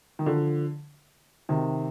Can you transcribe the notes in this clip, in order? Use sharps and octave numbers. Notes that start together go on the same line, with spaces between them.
D#3
D3 F3
C3 D#3